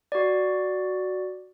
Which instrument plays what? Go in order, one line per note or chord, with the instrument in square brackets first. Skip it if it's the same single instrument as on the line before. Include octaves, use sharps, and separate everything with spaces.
[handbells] F#4 D5